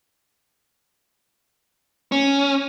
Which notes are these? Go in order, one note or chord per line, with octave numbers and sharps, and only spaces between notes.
C#4